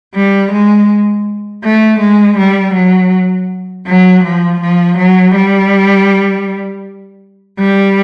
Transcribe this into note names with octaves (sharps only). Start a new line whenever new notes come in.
G3
G#3
A3
G#3
G3
F#3
F#3
F3
F3
F#3
G3
G3